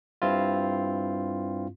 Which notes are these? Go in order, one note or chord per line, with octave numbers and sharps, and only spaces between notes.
G2 C4 E4 F4